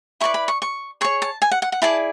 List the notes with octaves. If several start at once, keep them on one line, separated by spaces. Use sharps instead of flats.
E4 B4 D5 C#6
B5
C#6
C#6
G#4 C#5 C#6
A5
G#5
F#5
F#5
F#5
E4 G#4 D5 A5